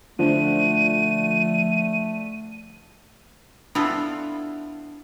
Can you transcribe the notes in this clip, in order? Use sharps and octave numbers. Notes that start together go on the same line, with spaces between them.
D3 F3 A3 D#7
B3 D4 E4 F4 A4